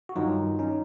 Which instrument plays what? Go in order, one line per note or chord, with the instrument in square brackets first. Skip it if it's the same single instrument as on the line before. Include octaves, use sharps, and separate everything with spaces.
[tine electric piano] F#4
G2 D#3 F#3 D#4 F4
C#4 D#4